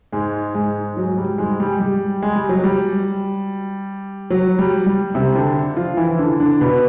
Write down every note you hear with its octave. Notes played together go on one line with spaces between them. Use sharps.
G#2 G#3
G#2 G#3
F#3
G3
G#2 G#3
G3
G3
G#3
G3
F#3
G3
F#3
G3
G3
C3 C4
D3 D4
F3 F4
E3 E4
D3 D4
D3 D4
B2 B3